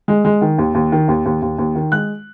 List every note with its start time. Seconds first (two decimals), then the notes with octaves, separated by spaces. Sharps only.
0.08 G#3
0.25 G#3
0.41 D#3
0.58 D#2
0.75 D#2
0.92 D#3
1.08 D#2
1.25 D#2
1.42 D#2
1.58 D#2
1.75 D#3
1.92 G#3 F#6